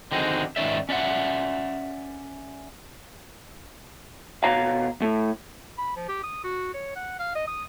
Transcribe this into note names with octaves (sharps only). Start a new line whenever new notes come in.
D3 D#3 C4 D#4 F#4 G#4
G#2 D#3 C#4 D5 E5
C#4 D5 E5 F#5
B2 C#5 F5 A#5
A2
B5
F3
G4
D#6
F#4
C#5
F#5
F5
D#5
D#6